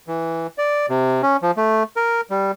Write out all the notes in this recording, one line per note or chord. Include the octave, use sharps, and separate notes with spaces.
E3
D5
C3
C#4
F3
A3
A#4
G3